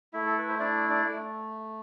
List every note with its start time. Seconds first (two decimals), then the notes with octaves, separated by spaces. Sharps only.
0.13 A3 E4 E5
0.26 A4
0.38 B4
0.49 C5
0.60 D4 E4 D5
0.90 D4 D5
1.06 A3